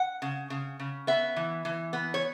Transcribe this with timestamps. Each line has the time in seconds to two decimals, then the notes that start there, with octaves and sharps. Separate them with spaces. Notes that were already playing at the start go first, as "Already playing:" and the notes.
Already playing: F#5
0.22 C#3
0.50 C#3
0.79 C#3
1.07 B3 E5
1.36 E3
1.65 E3
1.93 B3
2.14 C#5